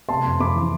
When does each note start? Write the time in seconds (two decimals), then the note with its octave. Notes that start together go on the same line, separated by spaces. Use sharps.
0.09 C3 A5 C6
0.25 F2
0.40 F2 B5 D6
0.55 E3